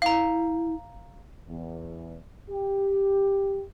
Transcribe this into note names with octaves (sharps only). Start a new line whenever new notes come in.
E4 F5 A#5
E2
G4